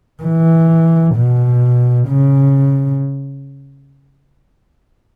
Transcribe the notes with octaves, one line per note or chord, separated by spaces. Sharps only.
E3
B2
C#3